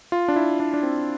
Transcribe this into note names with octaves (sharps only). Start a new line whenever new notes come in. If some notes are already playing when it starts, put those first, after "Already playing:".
F4
D4
E4
D4
D4
C4